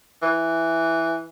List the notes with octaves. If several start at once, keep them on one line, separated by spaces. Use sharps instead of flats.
E3